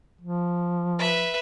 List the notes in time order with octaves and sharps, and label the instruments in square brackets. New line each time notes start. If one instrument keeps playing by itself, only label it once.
[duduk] F3
[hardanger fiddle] B4 E5